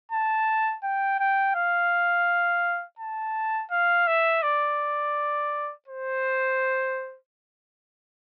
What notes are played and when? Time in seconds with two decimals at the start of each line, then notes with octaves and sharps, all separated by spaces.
0.12 A5
0.83 G5
1.19 G5
1.55 F5
2.99 A5
3.71 F5
4.07 E5
4.43 D5
5.88 C5